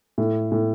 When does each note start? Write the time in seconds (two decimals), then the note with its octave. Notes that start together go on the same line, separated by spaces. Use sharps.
0.18 A2
0.52 A2